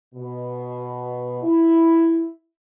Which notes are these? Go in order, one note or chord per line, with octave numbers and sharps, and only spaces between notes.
B2
E4